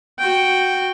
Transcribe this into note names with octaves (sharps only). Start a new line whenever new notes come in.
F#4 G5